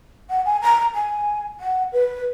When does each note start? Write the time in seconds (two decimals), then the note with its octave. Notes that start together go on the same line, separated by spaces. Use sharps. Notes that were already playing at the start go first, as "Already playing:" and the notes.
0.29 F#5
0.45 G#5
0.62 A#5
0.95 G#5
1.60 F#5
1.92 B4